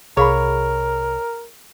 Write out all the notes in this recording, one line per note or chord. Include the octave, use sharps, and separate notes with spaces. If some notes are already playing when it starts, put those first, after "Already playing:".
C2 G#4 A#4 C#5 F5 B5